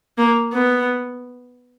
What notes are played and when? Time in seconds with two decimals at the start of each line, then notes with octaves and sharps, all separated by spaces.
0.18 A#3
0.53 B3